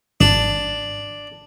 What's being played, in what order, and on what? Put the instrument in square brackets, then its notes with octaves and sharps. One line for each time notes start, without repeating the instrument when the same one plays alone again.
[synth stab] G#1 [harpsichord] D4